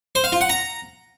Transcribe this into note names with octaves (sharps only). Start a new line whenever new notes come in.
C5
F5
F4
F#5
A#5